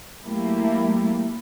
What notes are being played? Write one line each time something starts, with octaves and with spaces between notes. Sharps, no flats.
F#3 A3 A#3 E4 G4